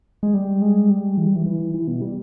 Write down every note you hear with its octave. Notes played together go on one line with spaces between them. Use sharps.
G#3
G3
G#3
G3
E3
G3
E3
E3
E3
B2
G3